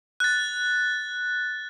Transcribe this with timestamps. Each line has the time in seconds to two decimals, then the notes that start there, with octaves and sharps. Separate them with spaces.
0.20 F#6 A6